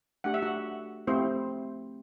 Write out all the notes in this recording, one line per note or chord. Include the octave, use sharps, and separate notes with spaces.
A3 D4 G4 F#5
E5
F#4 F#5
A3 C4 E4 G4 C5